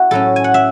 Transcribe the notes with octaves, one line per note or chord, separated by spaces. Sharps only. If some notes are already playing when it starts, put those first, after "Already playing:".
Already playing: E4 F#4
A2 F#3 C#4 A4
G#5
F#5
E5